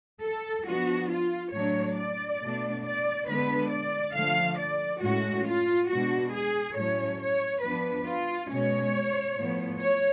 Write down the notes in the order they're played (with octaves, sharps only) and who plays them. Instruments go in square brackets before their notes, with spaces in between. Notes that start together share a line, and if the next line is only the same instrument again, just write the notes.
[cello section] A4
F3 B3 D4 F#4
F4
A2 F#3 A3 D4 C#5
D5
B2 A3 D4
D5
D3 G#3 B3 D4 B4
D5
D3 F3 A3 F5
D5
A2 G#3 C#4 F#4
F4
B2 G#3 D4 F#4
G#4
A2 F#3 A3 C#4 C#5
C#5
F3 B3 D4 B4
F4
B2 G#3 C#4 C#5
A2 F3 B3
C#5